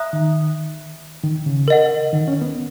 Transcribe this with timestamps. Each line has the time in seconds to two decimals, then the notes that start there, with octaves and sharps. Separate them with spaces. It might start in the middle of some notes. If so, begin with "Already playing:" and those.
Already playing: E5 A#5 D#6 F#6
0.13 D#3
1.24 D#3
1.46 C#3
1.68 A#4 D#5 F#5
2.13 D#3
2.28 C#4
2.42 B3